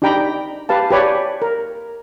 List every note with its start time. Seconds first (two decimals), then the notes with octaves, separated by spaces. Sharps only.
0.02 D4 D#4 G4 G5 A#5 B5
0.69 G4 B4 F5 A5
0.90 G4 B4 C#5 D5
1.42 A#4